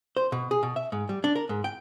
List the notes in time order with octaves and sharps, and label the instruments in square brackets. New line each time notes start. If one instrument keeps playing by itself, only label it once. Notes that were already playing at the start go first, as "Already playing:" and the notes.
[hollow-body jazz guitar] C5
B2
G#4
B2
E5
G#2
G3
D4
A#4
G#2
G5